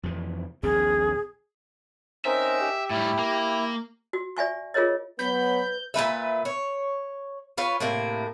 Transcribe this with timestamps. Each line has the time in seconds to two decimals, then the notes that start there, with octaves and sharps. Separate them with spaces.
0.03 F2 C3 E3
0.63 A#1 D#2 C4 G#4
2.25 C4 C#4 D#4 A#4 E5
2.61 G4
2.90 A2 G3 E4
3.19 A#3
4.13 F#4
4.37 D5 E5 G#5 C#6
4.74 F4 G#4 A#4 C#5 D#5
5.19 F#3 B3 B4 B5 G6
5.94 A#2 A3 B4 E5
6.45 C#5
7.57 F4 B4 C#5
7.80 A2 C3 A#3